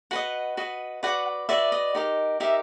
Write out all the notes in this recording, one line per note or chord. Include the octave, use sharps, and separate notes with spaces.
F#4 B4 D#5 F#5
F#4 B4 D#5
F#4 B4 D5 F#5
F#4 B4 D5 E5
D#5
D#4 G4 A#4 D#5
D#4 G4 A#4 D#5 E5